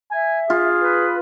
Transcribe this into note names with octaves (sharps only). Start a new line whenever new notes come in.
E5 G#5
F4 G#4
B4